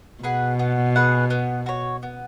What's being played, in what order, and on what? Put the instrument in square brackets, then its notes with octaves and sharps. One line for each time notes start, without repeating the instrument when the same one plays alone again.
[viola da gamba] B2 [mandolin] G#4 B4 F#5
[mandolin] B3
G#4 B4 F#5
B3
F#4 C#5
B3